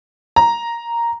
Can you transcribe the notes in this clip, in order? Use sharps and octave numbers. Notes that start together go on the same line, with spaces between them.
A#5